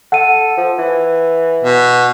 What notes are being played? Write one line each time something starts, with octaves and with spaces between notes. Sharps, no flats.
A4 F#5 D#7
F3
E3
B2